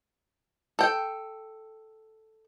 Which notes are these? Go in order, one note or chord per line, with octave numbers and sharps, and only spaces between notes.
A4 G5